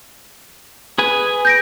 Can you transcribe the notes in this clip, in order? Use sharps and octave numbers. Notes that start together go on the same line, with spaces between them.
G#4 B4 G#5
G6 A#6 D7